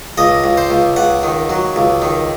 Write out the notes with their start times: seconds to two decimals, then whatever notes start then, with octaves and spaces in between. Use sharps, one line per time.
0.18 C#2 D#5
0.44 C#2
0.57 C5
0.70 C#2
0.96 C#2 F#5
1.23 D#3
1.49 F#3
1.76 C#2
2.02 D#3